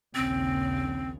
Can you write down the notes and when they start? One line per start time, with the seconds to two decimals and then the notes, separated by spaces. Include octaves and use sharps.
0.15 A#1 D#2 C#3 C4